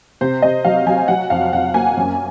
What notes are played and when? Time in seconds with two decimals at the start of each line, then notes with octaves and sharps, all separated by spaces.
0.21 C3 C5
0.42 C3 D#5
0.65 F#3 F5
0.86 F#3 G#5
1.08 F#3 F#5
1.30 F2 F5
1.53 F2 F#5
1.74 A#3 G#5
1.97 F#2